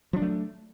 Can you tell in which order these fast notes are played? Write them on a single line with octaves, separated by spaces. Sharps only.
F3 D4 F#3 A3